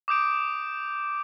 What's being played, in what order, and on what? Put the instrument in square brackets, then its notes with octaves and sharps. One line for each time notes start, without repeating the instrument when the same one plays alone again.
[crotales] D6 D#6 G6 D7